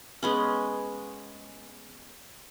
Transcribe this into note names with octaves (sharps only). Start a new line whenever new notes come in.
G#3 B3 C#4